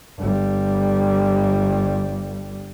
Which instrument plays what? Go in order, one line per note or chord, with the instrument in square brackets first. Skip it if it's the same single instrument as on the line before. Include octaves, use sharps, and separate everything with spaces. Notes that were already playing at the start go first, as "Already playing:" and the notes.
[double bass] G1 G3